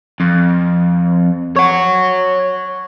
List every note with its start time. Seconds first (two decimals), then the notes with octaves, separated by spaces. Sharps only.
0.20 F2
1.56 C#5 F#5 C#6